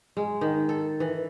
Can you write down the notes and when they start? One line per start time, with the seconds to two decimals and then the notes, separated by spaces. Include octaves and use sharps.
0.17 G#3
0.41 D#3
0.69 A4
1.00 E3